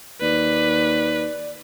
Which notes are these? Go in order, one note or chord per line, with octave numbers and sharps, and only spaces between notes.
D#2 B4 D5